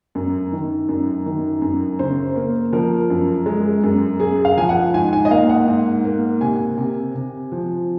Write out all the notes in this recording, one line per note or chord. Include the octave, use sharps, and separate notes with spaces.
F#2
D#3
F#2
D#3
F#2
C#3 C5
A#3
F3 A#4
F#2
G#3
F#2
F#2 G#4
F5
F3 G#5
F#5
G#2 G#5
G#5
D#5
A#3 F5
F#5
G#2
A#3
C3 G#5
C3
C3
F3